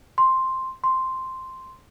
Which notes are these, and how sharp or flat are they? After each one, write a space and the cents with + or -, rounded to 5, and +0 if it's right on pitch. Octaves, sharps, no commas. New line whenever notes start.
C6 +0
C6 -5